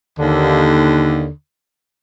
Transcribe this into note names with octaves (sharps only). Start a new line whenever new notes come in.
D#2 D3